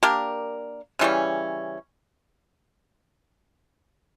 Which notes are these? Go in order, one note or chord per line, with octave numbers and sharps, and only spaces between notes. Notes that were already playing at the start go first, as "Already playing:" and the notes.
A#3 D4 G4 A#4
C#3 E3 G3 C#4